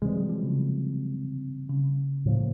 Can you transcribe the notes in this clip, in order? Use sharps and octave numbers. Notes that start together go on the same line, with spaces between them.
C3 E3 G3 G#3 C4
F#3
F3
C#3
C#3
A2 F3 A#3